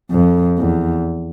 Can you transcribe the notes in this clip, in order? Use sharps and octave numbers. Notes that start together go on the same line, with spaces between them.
F2
E2